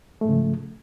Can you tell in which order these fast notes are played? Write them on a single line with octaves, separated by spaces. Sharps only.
A3 G#2 C#3 F3